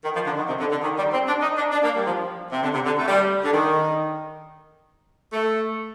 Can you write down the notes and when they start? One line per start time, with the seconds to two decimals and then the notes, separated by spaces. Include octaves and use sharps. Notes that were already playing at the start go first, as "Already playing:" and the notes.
0.04 D#3
0.15 F3
0.26 D3
0.37 D#3
0.48 C3
0.60 D3
0.71 D3
0.82 D#3
0.97 G3
1.12 C4
1.27 D4
1.42 D#4
1.57 D4
1.72 D4
1.84 A#3
1.96 G3
2.06 F3
2.52 C3
2.63 D3
2.74 C3
2.85 D3
2.98 A3
3.08 G3
3.44 D3
3.53 D#3
5.33 A3